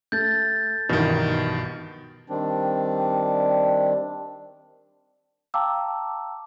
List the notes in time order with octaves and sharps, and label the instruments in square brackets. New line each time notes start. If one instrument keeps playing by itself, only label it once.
[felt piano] A3 [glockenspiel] G6 A6
[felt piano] B1 G2 E3 [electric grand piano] B2 D#3
[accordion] D#3 G3 C4 D4
[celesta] F5 G5 A5 A#5 D6 E6